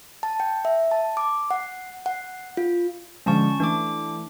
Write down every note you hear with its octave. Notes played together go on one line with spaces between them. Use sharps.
A5
G5
E5
A5
D6
F#5
F#5
F4
D3 F3 G#3 C#4 A5 C#6
E3 A3 D4 D6